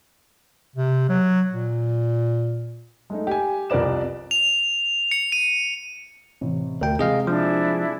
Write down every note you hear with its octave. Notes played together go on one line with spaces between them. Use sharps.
C3
F#3
A#2
G#3 A3 D#4
G4 G#5
C2 F2 A#4 B4 D5 E7
F7
C#7
D#7
A1 C3
D2 A#4 G5
C3 G#3 G#4 D#5 F5
F3 D4 E4 G#4